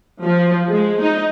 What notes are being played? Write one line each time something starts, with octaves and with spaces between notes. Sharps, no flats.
F3
G#3
D#4